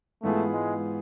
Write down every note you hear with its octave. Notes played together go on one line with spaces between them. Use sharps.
G#2 E3 A3 B3 F4 G#4
G#3